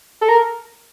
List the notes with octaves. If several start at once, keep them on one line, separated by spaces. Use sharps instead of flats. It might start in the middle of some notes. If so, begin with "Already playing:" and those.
A4
A#4